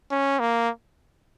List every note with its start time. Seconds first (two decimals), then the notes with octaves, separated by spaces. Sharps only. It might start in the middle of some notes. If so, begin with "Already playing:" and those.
0.11 C#4
0.40 A#3